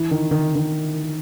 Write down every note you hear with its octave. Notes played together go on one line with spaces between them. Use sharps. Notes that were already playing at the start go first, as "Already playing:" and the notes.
Already playing: E3
D#3
D#3
D#3